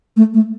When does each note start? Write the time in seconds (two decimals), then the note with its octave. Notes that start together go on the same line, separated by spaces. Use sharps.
0.17 A3
0.34 A3